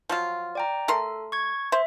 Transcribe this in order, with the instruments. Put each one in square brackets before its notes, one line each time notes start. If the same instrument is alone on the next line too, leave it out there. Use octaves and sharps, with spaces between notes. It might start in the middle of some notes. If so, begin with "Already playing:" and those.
[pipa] F3 F#3 F4
[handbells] D5 G5 A#5
[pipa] A3 A#4 C6 [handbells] A4
[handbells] C#6 G#6
[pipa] C5 [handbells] E5